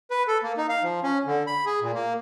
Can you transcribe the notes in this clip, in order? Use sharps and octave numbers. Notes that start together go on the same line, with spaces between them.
B4
A4
A#3
D#4
F5
F3
C#4
D3
B5
G#4
A#2
A#3